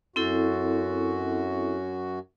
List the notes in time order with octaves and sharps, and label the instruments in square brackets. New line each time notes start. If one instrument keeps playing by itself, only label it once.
[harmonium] F#2 F#4 [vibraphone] C4 E4 A4